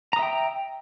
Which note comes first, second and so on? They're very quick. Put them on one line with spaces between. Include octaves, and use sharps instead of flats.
A#5 D#6 E5 G5